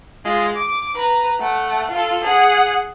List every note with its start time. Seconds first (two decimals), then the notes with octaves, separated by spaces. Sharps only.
0.25 G#3 F4
0.56 D6
0.95 B4 A#5
1.40 A3 F#5
1.91 F4 A4
2.24 G#4 F#5